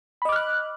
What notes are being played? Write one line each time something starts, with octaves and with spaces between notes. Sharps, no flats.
D#5 B5 D6 F6 F#6